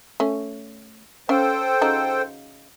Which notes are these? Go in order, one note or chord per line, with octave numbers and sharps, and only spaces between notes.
A3 C#4
C#4 A4 C5 F5 G5
C#3 D#4 F#4